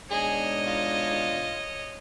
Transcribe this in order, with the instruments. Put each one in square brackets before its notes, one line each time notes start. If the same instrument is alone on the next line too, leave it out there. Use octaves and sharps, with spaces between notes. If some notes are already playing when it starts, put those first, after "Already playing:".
[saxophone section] G#2 B2 D4 [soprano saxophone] G#4 [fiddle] C#5 D#5
[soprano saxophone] F4